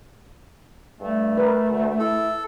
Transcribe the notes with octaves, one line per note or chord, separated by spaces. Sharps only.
G2 A3
A#4 B4
D2
E4 A4